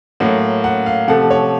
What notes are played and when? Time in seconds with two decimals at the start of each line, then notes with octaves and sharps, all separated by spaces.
0.20 A2 F#3 A#3 F#5
0.64 F#5
0.86 F5
1.08 C3 F3 A3 F#5
1.30 C#5